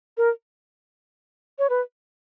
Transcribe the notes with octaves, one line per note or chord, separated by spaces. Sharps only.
A#4
C#5
B4